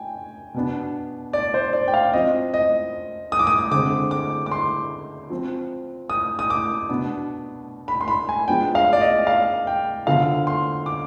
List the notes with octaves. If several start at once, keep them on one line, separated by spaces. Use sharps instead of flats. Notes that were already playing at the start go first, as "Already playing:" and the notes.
Already playing: G5 G#5
B2 B3 D4
D5
C5
D5
G5
F5
F3 C4 D#5
D#5
D#6
D6
D#6
D3 G#3 C4 D6
D6
D6
C6
F3 C4
D#6
D#6
D6
B2 B3 D4
B5
C6
B5
G#5
F3 G#3 B3 D4 G5
F5
D5
D#5
F5
G5
D3 F3 B3 F5
C6
D6